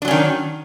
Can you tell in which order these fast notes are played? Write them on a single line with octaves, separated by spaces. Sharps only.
D4 F#3 C#4 D#3